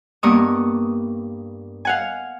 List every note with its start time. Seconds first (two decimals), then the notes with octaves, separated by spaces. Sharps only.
0.23 G2 A#3 B3 C#6 D#6
1.85 F5 F#5 G#5